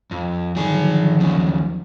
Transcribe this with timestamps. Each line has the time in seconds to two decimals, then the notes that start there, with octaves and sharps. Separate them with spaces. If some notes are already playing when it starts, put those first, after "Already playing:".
0.11 F2
0.57 D3 D#3 F3 F#3 G#4
1.20 D#2 C#3